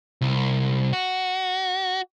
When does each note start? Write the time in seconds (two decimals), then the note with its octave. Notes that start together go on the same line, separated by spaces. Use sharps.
0.21 C2
0.93 F#4